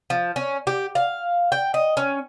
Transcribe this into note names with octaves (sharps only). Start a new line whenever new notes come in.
F3
C#4
G4
F5
G5
D#5
C#4